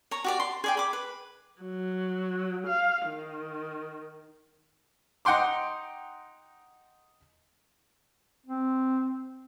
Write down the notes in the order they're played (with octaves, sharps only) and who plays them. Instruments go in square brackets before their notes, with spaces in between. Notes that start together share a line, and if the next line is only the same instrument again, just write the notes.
[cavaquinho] C#5 A#5
F#4 G4 D5
C6
G#4 D5 G5
B5 D6
B4
[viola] F#3
F5
D#3
[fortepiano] D#4 F#5 G5 C6 D6
[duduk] C4